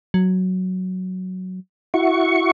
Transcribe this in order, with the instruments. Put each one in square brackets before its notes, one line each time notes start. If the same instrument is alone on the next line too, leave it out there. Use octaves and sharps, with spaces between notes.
[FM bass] F#3
[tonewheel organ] E4 F#4 C#6